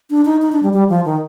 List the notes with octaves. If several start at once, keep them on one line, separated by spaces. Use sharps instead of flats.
D4
D#4
D#4
D4
G3
G3
F3
D#3